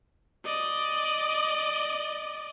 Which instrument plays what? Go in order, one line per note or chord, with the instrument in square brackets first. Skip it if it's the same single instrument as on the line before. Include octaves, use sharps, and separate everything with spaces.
[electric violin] D5 D#5